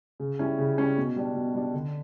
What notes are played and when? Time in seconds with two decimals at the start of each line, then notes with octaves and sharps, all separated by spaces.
0.20 C#3
0.39 G3 C#4 E4
0.59 C#3
0.78 G3 C#4 E4
0.97 B2
1.16 G3 D4
1.35 B2
1.55 G3 D4
1.74 D3